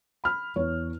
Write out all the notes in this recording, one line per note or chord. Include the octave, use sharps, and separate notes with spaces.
B5 F6
E2 C#5